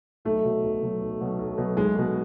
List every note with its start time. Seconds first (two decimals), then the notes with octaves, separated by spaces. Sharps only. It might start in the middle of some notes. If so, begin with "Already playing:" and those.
0.25 B1 A3
0.44 B2 F#3
0.63 B1
0.82 B2 F#3
1.01 B1
1.21 B2 F#3
1.39 B1
1.58 B2 F#3
1.77 B1 G#3
1.96 B2 G#3